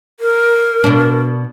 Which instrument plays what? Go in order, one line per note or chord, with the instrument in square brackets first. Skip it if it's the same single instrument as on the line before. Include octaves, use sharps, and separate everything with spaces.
[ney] A#4
[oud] B2 D4